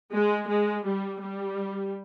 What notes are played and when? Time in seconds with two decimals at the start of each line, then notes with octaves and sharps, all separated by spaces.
0.11 G#3
0.48 G#3
0.85 G3
1.22 G3